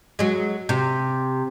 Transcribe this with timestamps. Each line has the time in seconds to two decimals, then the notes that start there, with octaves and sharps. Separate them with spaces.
0.19 F#3 G#3
0.69 C3